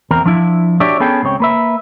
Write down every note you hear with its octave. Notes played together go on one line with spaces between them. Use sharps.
E2 C4 A#4 A#5
F3 D4 E4
D4 F#4 G4 C#5 D5 E5
B3 C#4 G#4 A4 G5
C#2 C#3 C4 C#5 G5
A#3 B4 E5